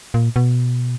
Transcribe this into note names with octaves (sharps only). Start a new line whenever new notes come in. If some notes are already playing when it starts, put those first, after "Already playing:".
A#2
B2